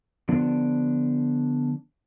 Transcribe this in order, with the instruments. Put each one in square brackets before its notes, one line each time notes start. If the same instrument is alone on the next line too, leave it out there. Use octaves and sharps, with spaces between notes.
[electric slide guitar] D3 F3 B3 D4